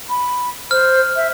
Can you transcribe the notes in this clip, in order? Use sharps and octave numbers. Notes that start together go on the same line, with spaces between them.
B5
C5 F6
E5